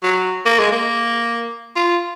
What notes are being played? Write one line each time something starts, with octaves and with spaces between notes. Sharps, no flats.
F#3
A#3
G#3
A#3
F4